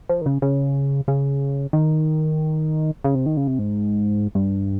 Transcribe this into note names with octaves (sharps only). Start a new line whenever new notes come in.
F3
D#3
C#3
C#3
C#3
D#3
C#3
C3
D#3
C#3
C3
G#2
G2